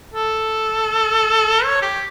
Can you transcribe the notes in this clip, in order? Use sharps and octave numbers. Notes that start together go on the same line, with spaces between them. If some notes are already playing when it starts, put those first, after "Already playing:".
A4
C#5
G4